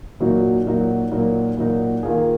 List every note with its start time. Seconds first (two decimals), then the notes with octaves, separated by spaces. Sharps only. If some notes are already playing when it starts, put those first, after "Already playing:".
0.20 A#2 F#3 A#3 D#4 F#4
0.66 A#2 F#3 A#3 D#4 F#4
1.12 A#2 F#3 A#3 D#4 F#4
1.57 A#2 F#3 A#3 D#4 F#4
2.03 D#3 A#3 F4 G#4